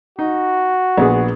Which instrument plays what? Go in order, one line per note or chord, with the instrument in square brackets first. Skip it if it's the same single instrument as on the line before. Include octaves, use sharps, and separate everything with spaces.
[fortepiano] D#4 [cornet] F#4
[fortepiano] A#1 B3 G#4